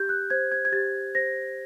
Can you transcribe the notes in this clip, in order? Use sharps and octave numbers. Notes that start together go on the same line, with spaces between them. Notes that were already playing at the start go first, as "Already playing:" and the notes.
Already playing: G4 G6
F#6
C5 G#6
G#6
G#6
G4 A6
C5 A#6